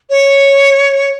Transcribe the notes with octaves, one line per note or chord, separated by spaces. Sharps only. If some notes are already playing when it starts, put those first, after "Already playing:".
C#5